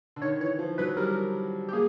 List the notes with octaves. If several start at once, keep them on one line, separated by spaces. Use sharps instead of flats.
D3
D#3 C#5
E3 C#5
F3
F#3 B4
G3 A#4
G4
A#3 G#4